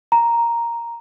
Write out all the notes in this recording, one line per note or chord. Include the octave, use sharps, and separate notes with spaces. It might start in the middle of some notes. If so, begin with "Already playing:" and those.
A#5